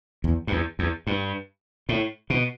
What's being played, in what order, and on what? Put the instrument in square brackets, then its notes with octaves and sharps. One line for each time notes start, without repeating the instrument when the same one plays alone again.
[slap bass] E2
G2
E2
E2
G2
A2
B2